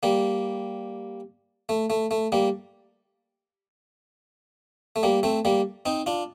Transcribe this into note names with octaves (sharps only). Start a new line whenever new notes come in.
G3 A#3
A3
A3
A3
G3 A#3
A3
G3 A#3
A3 C4
G3 A#3
C4 D#4
D4 F4